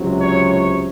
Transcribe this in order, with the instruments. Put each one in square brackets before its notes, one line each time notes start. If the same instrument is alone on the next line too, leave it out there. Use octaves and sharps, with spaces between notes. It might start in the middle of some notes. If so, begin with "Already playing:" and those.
Already playing: [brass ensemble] C#2 C3 F#3
C#5
C#5